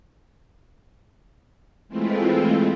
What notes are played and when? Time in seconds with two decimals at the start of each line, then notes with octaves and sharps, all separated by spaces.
1.89 E3 G#3 A3 C4 E4 F4